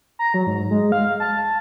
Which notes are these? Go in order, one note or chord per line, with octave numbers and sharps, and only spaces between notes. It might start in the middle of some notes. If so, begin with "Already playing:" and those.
A#5
F#3
G#2
G#3
F5
A5